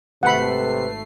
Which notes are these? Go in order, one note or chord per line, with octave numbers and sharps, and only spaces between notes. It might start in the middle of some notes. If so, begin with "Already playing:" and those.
G#1 C3 A3 B4 F#5 B5 C7